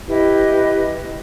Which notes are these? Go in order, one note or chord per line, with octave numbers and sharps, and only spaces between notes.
E4 G4 B4 D#5